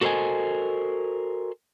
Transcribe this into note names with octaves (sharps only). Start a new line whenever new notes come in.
F#4 A4 A#4 C5 D#5 G#5